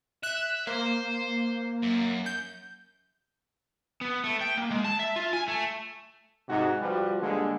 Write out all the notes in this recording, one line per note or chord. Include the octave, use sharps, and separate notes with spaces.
E5 F#6
A#3 C5
F#2
G6
B3
A3
G5
A#3
G#3
A5
E5
F4
G#5
A3
G#2 C3 D#4 F#4
F3 G3 F#4 B4
D3 G3 G#3 A#3